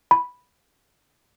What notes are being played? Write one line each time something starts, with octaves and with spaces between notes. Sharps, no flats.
B5